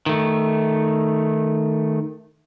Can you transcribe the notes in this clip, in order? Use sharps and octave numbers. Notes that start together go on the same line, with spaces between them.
D#3 A3